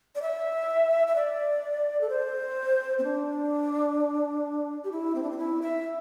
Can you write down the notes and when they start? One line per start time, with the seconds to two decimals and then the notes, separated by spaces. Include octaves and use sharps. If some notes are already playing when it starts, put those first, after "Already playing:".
0.15 D5
0.22 E5
1.07 E5
1.15 D5
2.01 A4
2.10 C5
2.99 C4
3.04 D4
4.84 G4
4.92 E4
5.15 C4
5.23 D4
5.31 C4
5.38 E4
5.62 E5